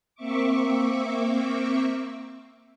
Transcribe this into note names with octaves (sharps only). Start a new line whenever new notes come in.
A#3 C4 E5 C#6 D6